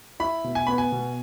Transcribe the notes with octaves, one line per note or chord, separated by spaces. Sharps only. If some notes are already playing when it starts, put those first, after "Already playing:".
E4 B5
B2
G#5
B3 B5
G#5
B2